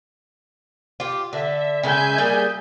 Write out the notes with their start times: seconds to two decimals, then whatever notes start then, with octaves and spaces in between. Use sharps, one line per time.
1.00 F4 G4
1.33 D3 E5
1.83 C#3 G#3 E5 G#5 G6
2.18 G3 A#3 G#4